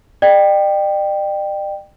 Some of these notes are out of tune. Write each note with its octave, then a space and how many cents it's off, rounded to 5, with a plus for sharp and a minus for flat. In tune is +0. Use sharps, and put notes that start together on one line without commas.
D5 +45 G5 +0